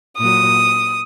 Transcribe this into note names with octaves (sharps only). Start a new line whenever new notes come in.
A#2 F#3 D#6